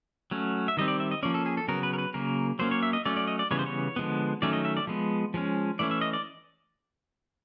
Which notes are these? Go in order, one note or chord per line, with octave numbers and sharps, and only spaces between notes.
F#3 A3 C#4
E5
D#3 G3 C4 D#5
D5
E5
D#5
F3 A#3 C#4 D5
A4
G#4
A4
C#3 F#3 B3 A#4
B4
A#4
B4
C#3 F#3 A#3 A#4
F#3 A#3 C#4 C5
C#5
E5
D#5
F#3 A3 C#4 D5
D5
D#5
D5
C#3 E3 G3 B3 C#5
C5
C#5
D3 F3 G#3 B3
D#3 F#3 A3 C#4 D5
D#5
E5
D5
F3 G#3 B3
F3 G#3 C#4
E3 A3 C#4 D5
E5
D#5
D5